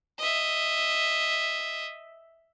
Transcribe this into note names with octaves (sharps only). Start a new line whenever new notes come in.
D#5 E5